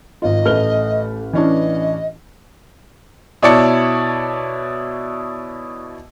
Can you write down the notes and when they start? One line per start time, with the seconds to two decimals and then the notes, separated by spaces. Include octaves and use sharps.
0.22 G#1 D#3 F4 D#5
0.46 A1 A3 B4 F6 G7
1.33 E3 C#4 D4 D#5
3.42 B2 E4 C#5 D5 A5 C#7